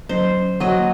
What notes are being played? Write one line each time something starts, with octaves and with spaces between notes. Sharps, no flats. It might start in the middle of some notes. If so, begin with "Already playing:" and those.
F#3 C#4 C5
F#3 A#3 F#4 D#5